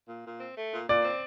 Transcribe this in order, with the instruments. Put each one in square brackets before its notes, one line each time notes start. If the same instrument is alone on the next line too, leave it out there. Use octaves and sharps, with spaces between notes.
[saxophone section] A#2
A#2
C4
A3
A#2
[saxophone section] A#2 [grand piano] D5
[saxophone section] C4